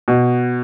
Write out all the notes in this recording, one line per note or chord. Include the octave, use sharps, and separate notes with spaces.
B2